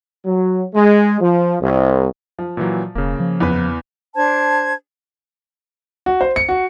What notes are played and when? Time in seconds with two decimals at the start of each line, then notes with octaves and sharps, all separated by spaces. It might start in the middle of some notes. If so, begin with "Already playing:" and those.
0.25 F#3
0.74 G#3
1.20 F3
1.61 C2
2.39 F3
2.57 A#2 E3 F#3
2.95 E1 C#3 A#3
3.20 F3
3.40 E2 E3 B4
4.15 D4 C5 A5 G#6
6.06 F#4
6.21 C5
6.36 C#7
6.49 F#4